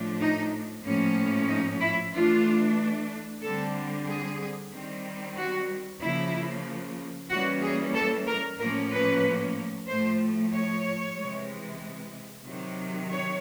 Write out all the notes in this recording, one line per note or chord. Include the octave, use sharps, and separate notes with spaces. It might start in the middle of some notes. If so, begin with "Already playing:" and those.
Already playing: A2 F3 A3 D4
D#4
A2 F3 A#3 C#4
D#4
E4
E3 A3 D4 F4
D3 G3 C4 A4
G#4
D#3 G3 C4
F#4
C#3 F3 A#3 E4
E3 G3 A#3 C#4 F#4
G#4
A4
A#4
A2 F3 A#3 C#4 A#4
B4
A2 F3 A3 C5
C#5
C3 E3 G#3
C3 D#3 F#3
C#5